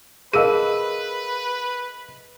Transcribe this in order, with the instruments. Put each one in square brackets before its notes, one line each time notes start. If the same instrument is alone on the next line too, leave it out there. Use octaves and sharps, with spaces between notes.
[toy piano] G#4 A#4 A5 [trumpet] B4 [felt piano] D#5 F5 D#7